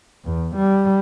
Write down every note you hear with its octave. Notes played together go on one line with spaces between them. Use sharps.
E2
G3